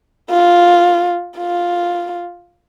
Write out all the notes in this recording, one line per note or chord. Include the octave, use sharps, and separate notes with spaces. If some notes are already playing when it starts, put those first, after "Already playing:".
F4
F4